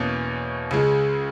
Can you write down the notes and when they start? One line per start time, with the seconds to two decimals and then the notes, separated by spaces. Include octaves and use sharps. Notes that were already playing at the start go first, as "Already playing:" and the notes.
Already playing: E2 B2 A#3 C#4
0.71 C#2 C#3 G#3